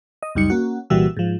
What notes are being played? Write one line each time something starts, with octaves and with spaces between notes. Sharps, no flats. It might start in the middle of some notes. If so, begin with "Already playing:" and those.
D#5
C#2 F#2 G3 D#4 C#7
A#3 C#4 F#4
C2 A#2 E3 G3 F#4 E6
G#2 F3